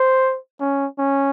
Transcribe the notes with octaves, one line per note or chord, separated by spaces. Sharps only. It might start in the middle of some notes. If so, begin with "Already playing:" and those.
Already playing: C5
C#4
C#4